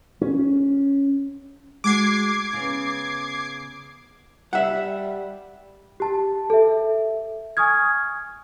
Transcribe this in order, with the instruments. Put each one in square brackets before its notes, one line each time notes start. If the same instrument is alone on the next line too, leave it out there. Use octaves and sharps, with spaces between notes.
[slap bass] C#4
[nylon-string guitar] G#3 F#4 F#5 [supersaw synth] D6 G#6 C7
[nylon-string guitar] C#3 B3
[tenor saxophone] G3 [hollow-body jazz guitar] E5 F#5
[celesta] G4 A5
A4 E5
G#5 C#6 D#6 F6 G#6